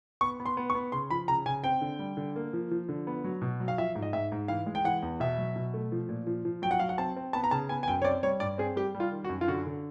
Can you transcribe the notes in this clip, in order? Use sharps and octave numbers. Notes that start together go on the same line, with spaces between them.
B3 C#6
B3
C6
B3
C#6
B3
C#3 C6
F3 B5
C#3 A#5
C#3 G#5
C4 G5
D3
G3
D3
A#3
F3
F3
D3
B3
F#3
B2
F#3
F5
F3 E5
G#2
D#5
G#2 E5
G#2
E3 F5
G#3
G5
E3 F#5
E2
B2 E5
F#3
B2
A3
F3
A#2
F3
F3
F#3 G5
F#5
F#3 F5
F#5
C4 A5
C4
B3 A5
A#5
C#3 A5
B3 G#5
G#5
F#2 G5
C#5
C4 D5
G3 C#5
G2 D5
C4 G#4
G3 G4
G3
F4
D#3
F#4
F#2
F4
D3 F#4
D3